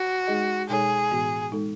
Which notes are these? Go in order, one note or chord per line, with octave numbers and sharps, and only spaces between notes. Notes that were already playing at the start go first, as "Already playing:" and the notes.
Already playing: F#4
G#3 D#4 G#4 D#5
B2 G#3 D#4 G#4 A4 C#5
A2 E3 B3 F#4
G#3 D#4 A4